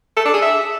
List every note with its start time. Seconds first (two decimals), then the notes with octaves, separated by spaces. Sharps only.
0.17 A4
0.25 D4
0.34 G#4
0.42 E5